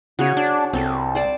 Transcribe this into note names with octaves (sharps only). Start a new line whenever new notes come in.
C#3 F#4 G#4 C#5
D4
C2 C4 A4
C5 D5 A5